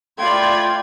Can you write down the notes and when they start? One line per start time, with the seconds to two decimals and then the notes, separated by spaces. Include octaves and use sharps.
0.18 A3 F4 D5 G5 B5 C6 G#6